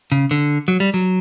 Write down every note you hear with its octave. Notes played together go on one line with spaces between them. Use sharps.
C#3
D3
F#3
G3
F#3